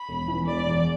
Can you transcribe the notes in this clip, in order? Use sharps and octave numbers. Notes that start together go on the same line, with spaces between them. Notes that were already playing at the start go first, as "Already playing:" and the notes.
Already playing: B5
E1
E3
E1 D5
E2